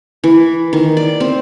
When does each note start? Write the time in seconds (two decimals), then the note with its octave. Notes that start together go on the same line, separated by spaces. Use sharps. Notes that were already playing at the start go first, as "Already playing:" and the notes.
0.24 E3
0.73 D#3
0.97 D5
1.20 C4